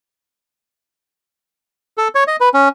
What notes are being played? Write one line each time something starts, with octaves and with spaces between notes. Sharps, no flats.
A4
C#5
D#5
B4
C#4